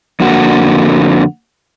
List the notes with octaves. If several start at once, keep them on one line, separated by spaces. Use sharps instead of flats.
F2 D3 A#3 F#4